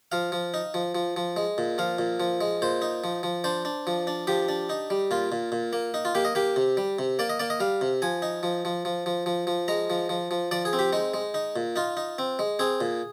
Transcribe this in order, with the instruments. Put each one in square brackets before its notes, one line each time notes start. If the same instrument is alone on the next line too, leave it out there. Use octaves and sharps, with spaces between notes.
[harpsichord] F3 F5
F3
D#4
F3
F3
F3
G#3
A#2
F3 F5
A#2
F3
G#3
A#2 C5
D#4
F3
F3
D4 C5
D4
F3
D4
F3 G4
D4
D#4
G3
A#2 F4
A#2
A#2
A#3
D#4
F4
A#3 G4
D#5
A#3 G4
C3
G3
C3
A#3 D5
D#5
A#3 D5
D#5
G3 F5
C3
F3 G#5
D#4
F3
F3
F3
F3
F3
F3
G#3 A#5
F3
F3
F3
F3 D5
G#4
C4
G4
G#3 D#4
G#3
D#4
A#2
D#4 F4
D#4
C4
G#3
C4 G#4
A#2